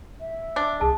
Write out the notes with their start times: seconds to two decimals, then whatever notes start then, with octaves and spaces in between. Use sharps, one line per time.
0.21 E5
0.56 D4
0.81 C2 G#4 A5